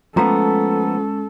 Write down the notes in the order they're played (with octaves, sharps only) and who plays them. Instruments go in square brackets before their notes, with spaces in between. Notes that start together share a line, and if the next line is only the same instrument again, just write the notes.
[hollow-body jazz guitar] F3 A3 B3 [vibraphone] G#3 C#4 [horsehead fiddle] A4 [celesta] A#5